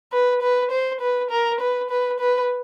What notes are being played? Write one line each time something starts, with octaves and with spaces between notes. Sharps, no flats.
B4
B4
C5
B4
A#4
B4
B4
B4